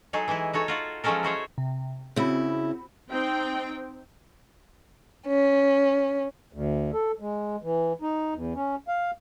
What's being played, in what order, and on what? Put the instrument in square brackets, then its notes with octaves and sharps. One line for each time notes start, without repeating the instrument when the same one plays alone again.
[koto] F#3 G#3 D#4 G#4 A4
E3 G#3 D#4 E4
D#4 F#4 A4 C#5
F4 F#4 F#5
F3 F#3 G#3 C#4 A4 A#4
E4 F#4 C5 C#5
[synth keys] C3
[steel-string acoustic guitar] C#3 E4 [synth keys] C4 F#4 B5
[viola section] C4 D#4 G5
[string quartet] C#4
[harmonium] D2
A4
G#3
E3
D#4
E2
C#4
F5